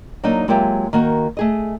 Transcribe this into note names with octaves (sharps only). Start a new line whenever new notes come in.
F#3 A#3 D4 D#4
F#3 G#3 A#3 F4 G4 E5
D#3 A#3 F#4
A3 G#4 D#5